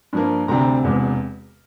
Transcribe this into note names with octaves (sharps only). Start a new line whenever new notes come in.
G2 F3 A#3
D2 C3 G3 C4 A#5
E1 E2 C3